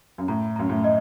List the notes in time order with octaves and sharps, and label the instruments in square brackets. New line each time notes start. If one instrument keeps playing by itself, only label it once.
[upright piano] F#2
[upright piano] A2 [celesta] A#5
[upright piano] F#2 [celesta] A#5
[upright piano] A2
[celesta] D#5